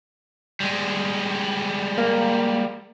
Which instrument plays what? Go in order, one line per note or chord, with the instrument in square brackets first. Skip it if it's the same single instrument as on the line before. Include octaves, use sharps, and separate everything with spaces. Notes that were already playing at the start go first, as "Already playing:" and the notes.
[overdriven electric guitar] G3 G#3
[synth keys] A#3